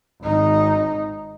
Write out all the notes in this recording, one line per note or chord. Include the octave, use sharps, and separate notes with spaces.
G#1 D#4